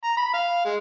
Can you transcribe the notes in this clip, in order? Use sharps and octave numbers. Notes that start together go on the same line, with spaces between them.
A#5
B5
F5
G#3